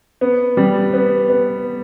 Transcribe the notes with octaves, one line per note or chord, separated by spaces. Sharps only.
B3
G3
B3
B3